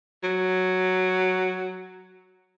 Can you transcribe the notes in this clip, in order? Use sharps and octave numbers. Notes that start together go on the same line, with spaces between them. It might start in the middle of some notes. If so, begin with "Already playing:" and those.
F#3